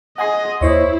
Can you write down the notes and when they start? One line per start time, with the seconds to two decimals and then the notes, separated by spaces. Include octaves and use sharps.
0.18 G#4 D#5 F#5 G#5 C6
0.61 D#2 E4 C5 C#5 D#5